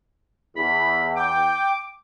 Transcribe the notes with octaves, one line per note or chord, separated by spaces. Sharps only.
E2 B5
G5 D6